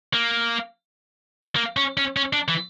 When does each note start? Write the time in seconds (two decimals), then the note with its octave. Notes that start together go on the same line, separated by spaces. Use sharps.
0.13 A#3
1.56 A#3
1.77 C#4
1.97 C#4
2.17 C#4
2.33 D4
2.48 E3